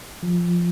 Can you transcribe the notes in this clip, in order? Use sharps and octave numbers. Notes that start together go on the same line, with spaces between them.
F3